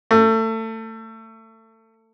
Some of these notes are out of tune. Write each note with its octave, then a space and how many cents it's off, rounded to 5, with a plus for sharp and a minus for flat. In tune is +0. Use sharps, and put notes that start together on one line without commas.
A3 +25